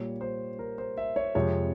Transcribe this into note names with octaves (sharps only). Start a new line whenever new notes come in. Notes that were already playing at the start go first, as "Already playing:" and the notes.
Already playing: A#2 G3 A#3 C#5
C5
A#4
C5
E5
C#5
F2 C3 F3 G#3 C#5